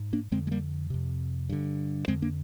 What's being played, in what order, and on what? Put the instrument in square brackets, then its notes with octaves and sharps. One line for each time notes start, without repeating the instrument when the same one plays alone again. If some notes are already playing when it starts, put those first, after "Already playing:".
Already playing: [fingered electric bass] G#2
A#3 D4
F2 D3 G#3 C4
G#3
G3 A#3
F2 C3
G2 D3
F2 D3 G#3 C4
A#3 D4